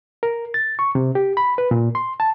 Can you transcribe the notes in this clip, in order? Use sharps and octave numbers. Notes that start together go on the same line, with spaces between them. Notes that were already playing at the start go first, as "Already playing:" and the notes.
A#4
A6
C#6
C3
G4
B5
B4
A#2
C6
A5